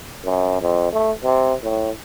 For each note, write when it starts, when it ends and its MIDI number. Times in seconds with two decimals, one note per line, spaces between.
0.25 0.56 42
0.61 0.88 41
0.93 1.11 57
1.23 1.54 48
1.64 1.91 45